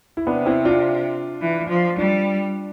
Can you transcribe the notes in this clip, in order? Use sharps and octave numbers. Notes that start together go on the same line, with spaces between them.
E4
C3 B3 D4
C4 E4
D4 F4
E3
F3
G3 D4 F4